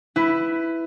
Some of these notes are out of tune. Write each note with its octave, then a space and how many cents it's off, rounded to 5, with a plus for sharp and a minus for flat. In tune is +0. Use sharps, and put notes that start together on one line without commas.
E4 +0 B4 +15